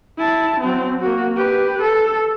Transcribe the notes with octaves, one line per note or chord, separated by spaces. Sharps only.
E4 A5
F#3 C4
A#3 F#4
G4 B4
A4